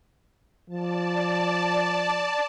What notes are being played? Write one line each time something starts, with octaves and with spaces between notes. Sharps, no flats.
F3 D5 A5